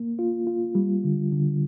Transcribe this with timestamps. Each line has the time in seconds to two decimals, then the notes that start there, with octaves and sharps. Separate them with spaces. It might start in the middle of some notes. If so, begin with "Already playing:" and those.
Already playing: A#3
0.19 F4
0.47 F4
0.75 G3
1.04 D3
1.32 D3